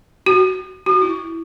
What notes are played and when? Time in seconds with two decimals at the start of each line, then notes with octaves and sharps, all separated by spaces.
0.26 F#4
0.86 F#4
1.02 E4